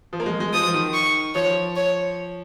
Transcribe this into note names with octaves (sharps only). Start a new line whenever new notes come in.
F3
A#3
G#3
G#3
F3 D#6
F3
D#3
C#6
F3 C#5
C#5